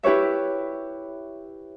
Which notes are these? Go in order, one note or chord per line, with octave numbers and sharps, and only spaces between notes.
E4 G4 B4 C#5 E5